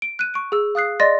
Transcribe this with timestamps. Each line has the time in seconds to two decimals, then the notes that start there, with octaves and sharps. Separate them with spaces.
0.02 D7
0.19 F#6 D#7
0.34 C#6 D7
0.52 G#4 E6
0.75 F5 D#6 F#6 C7
1.00 D5 D#5 C6 A6 A#6